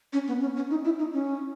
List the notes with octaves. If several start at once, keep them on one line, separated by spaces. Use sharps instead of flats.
C#4
B3
C#4
C#4
D#4
E4
D#4
C#4